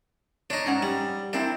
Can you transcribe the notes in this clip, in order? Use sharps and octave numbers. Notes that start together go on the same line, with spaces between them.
D4 D#4 C#5
G#2 C#4 F#5
G3
A#3 C4 D4 E4